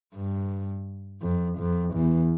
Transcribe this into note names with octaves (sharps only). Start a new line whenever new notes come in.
G2
F2
F2
E2